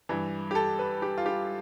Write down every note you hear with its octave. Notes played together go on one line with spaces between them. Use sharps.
G2 E3
G4
A4
B4
G4
F4
G4